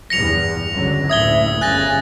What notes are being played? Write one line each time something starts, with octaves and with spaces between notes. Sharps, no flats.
E2 G2 A#6 C#7 F7
C#2 D3 F#3
F#1 D2 A2 E5 D#6 G#6 G7
G1 C#3 G#5 F#6 A6 A#6